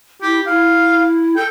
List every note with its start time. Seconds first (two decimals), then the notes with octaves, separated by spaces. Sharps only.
0.22 E4 G4
0.47 E4 F5
1.36 A4 G5